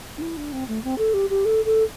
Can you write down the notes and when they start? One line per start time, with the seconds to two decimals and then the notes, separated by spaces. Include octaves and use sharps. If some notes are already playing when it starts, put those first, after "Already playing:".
0.18 D4
0.22 E4
0.37 D4
0.53 C4
0.68 A3
0.84 C4
0.98 A4
1.14 G4
1.30 G4
1.45 A4
1.65 A4